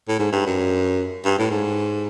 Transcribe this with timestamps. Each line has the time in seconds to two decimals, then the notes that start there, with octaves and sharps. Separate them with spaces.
0.09 A2
0.19 G#2
0.32 G2
0.46 F#2
1.25 G2
1.39 A2
1.51 G#2